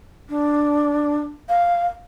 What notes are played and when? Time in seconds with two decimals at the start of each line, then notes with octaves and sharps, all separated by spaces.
0.29 D4
1.48 F5